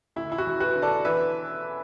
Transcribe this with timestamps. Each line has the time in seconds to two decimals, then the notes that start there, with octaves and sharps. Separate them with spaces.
0.16 D2 E4
0.32 E4
0.38 F#4
0.46 E1
0.60 F#4 B4
0.75 D3
0.82 A4 D5
1.05 E3 B4 E5